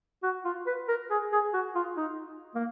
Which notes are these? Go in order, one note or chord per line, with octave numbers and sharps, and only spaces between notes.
F#4
F4
B4
A#4
G#4
G#4
F#4
F4
D#4
A#3